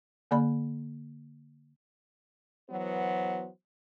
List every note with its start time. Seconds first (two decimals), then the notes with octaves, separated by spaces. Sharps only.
0.31 D3 A#3 D5 B5
2.70 E3 F#3 B3 F#4 C5